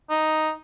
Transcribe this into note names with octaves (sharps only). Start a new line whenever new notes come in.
D#4